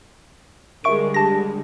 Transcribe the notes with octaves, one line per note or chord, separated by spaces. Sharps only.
D3 G3 G#3 A#4 E5 C#6 D7
G4 A5 A#6